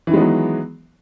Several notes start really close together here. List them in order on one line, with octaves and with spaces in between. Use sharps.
E3 D#3 G#3 B3 F#3